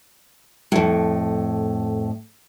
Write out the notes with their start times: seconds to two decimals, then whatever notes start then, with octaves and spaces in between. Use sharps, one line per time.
0.72 F2 A2